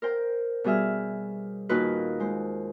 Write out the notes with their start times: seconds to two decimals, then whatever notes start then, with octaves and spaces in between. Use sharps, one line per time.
0.02 A#4 C5 G5
0.64 B2 G3 G#4 E5 F6
1.69 D#2 A#2 D#4 F4 F#4 B4
2.20 G#3 C5